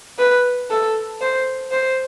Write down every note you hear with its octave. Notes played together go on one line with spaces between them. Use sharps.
B4
A4
C5
C5